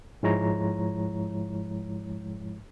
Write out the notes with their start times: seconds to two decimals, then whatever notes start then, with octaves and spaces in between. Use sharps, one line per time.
0.23 G#2 F3 G#3 E4 C#5 A#5